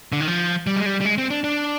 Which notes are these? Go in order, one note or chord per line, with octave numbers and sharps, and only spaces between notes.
D3
D#3
F3
G3
G#3
G3
G3
G#3
C4
D4
D4